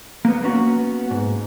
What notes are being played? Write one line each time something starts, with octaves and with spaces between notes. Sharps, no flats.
A#3 B3
A#3 B3 C#4 F#4
G#2